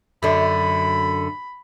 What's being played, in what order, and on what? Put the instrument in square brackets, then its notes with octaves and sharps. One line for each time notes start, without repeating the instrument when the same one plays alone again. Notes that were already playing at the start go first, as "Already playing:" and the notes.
[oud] F#2 D3 [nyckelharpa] B5